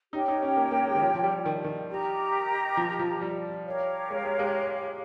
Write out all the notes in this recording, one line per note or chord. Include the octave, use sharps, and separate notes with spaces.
D#4 G4 A#4 C#5 G5
D#4
C#4
A#3
A#3
G#3
D#3
F3
F3
G3
D#3
D#3
G4 A#4 D#5 A#5
F3
F3
G3
G4 A#4 C#5 F5
G#3
G#3
G#3